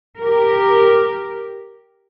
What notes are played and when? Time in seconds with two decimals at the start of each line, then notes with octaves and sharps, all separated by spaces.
0.19 G4 A#4